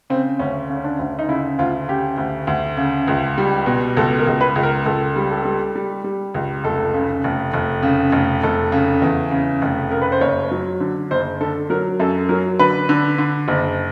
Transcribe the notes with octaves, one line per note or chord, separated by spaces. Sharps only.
C#3 C4
D2 C#4
C#3
C#4
D4
D2
D#4
C#3 E4
D2 F4
C#3 G4
D2
D2
C#3
C#2
G3
B2
C#2 A4
A#4
C#2
B4
C#2
A#4
C#2 A4
G3
A4
G3
G3
G3
C#2
F1 A4
C#3
F1
F1
C#3
F1
F1 A4
C#3
E2
C#3
F1
C#3 A#4
B4
C5
F#1 C#5
F#3
D3
F#1 C5
D3 A4
F#3 A#4
F#2 A4
F#3 A#4
D3 B4
D3
D3
F#1